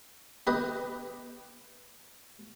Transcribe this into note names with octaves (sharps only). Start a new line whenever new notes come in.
G4 B4 D#5